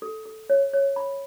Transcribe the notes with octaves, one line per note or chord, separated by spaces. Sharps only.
A4
A4
C#5
C#5
B5